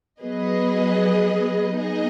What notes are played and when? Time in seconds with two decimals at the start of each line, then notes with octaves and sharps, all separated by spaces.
0.20 F#3 B3 G#4 B4 D#5
1.75 B3 D#4 G#4 D#5